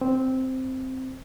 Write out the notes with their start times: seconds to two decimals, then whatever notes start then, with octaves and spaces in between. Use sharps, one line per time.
0.01 C4